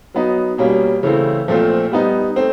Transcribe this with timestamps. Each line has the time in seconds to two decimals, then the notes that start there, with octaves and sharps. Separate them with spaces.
0.14 F#3 B3 D#4
0.58 B2 G3 A#3 C#4
1.03 C#3 E3 A3 C4
1.48 A#2 F3 A3 C4 F4
1.92 G3 B3 D#4
2.36 A3 C4